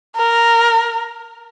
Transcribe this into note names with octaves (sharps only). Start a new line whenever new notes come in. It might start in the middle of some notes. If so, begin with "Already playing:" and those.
A#4